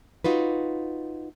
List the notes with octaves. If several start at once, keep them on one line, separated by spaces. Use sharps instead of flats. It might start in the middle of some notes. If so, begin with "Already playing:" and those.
D#4 F4 F#4 B4